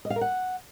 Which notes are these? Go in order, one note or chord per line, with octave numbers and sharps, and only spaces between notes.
D#5
F5
A#4
F#5